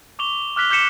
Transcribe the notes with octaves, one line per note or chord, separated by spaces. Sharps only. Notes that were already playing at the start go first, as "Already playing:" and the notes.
C#6 D6 F7 G7
D6 F6 F#6 B6 F7 G7
D6 G6 B6 C#7 E7